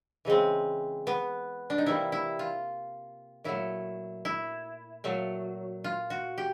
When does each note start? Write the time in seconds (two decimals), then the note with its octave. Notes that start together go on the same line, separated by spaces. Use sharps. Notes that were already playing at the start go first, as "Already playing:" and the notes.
0.25 C#3 E3 G#3 C4
1.07 B3
1.70 D4
1.78 D#4
1.86 C3 E3 G3 A#3 E4
2.12 E4
2.39 F4
3.44 A#2 F#3 A3 E4
4.25 E4
5.04 A#2 F#3 A3
5.84 F4
6.10 F#4
6.38 G4